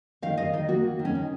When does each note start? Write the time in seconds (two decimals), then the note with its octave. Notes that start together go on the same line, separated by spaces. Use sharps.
0.22 D#3 F5
0.37 D#3 D#5
0.53 D#3 D#5
0.68 A#3 F#4
0.84 A#3
0.99 D#3
1.05 C#4
1.15 D#3